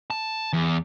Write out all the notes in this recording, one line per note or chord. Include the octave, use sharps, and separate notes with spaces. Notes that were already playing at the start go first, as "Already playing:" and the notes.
A5
E2